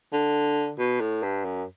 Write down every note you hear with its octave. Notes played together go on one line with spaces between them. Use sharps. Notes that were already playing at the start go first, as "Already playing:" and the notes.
D3
B2
A2
G2
F#2